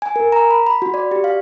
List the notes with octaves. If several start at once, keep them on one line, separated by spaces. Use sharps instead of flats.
G#5
A#4
A#5
B5
B5
F#4
D5
G4
F5